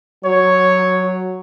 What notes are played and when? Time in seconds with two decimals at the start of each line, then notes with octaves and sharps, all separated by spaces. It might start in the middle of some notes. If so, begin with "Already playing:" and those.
0.25 F#3 C#5